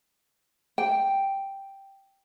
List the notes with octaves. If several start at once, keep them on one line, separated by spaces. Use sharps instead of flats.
G5